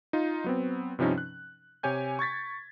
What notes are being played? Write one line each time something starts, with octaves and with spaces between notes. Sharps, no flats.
D#4 F4
F#3 B3 C4
G2 C3 F3 C#4 D#4
F#6
C3 G4 C#5 G#5 G6
C#6 G#6 A6 B6